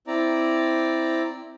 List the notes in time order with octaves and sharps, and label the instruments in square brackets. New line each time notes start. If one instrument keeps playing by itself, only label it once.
[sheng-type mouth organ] C4 E4 D5 A#5